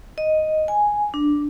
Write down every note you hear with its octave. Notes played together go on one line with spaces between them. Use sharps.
D#5
G#5
D4